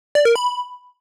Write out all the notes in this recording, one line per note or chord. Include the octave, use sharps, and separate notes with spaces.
D5
A#4
B5